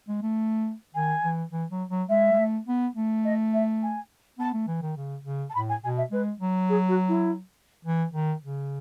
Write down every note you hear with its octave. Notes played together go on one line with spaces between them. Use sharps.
G#3
A3
D#3 G#5
E3
E3
F#3
F#3
G#3 E5
G#3
A3
B3
A3
D#5
E5
G#5
B3 A5
A3
E3
D#3
C#3
C#3
A5
A2 B5
G#5
B2 G#5
E5
G#3 B4
F#3
G#4
F#4
E4
E3
D#3
C#3